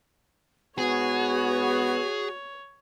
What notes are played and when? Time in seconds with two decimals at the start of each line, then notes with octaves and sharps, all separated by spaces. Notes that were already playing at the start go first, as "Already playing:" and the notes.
0.78 G#2 B3 F#4 G#4 C#5